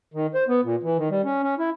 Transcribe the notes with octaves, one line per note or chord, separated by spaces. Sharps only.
D#3
C5
B3
A#2
E3
D#3
G3
C#4
C#4
E4